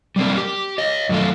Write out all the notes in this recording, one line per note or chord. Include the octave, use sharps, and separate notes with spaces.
G3 A#3 C4 D4 A#4
G4
C#5 D#5
F#2 D#3 A3 F4